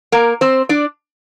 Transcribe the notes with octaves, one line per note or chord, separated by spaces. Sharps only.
A#3 A#4
C4 C5
D4 D5